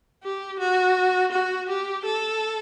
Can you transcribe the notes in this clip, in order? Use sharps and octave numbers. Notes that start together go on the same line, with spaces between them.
G4
F#4
F#4
G4
A4